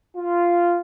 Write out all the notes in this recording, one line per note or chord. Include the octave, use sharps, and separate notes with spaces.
F4